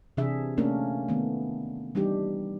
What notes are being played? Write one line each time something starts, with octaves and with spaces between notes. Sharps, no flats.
C3 E3 D4 G#4 E5
A3 A#3 C#4 D4 A#4
D#3 A3 B3
E3 G3 D4 D#4 G4